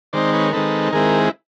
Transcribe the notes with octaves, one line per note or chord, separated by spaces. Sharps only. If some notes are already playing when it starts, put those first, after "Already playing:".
D#3 G#3 C4 D#4 C5 D5
B4 C#5
A#4
D#3 G#3 C4 D#4 A4 B4
D#3 G#3 C4 E4 G#4 A#4